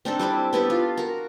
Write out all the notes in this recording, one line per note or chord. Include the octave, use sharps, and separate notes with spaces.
C4 D4 D#4 A4
G3 C4 E4 D6
B3 E4 G4 A4
F4
F#4 A#4